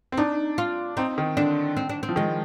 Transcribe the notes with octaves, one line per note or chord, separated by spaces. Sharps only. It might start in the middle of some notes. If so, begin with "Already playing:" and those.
C4
D4 D#4
F4
C4 D#4
D#3
D3 D4
C4
D4
C4
F3
D#3 G#3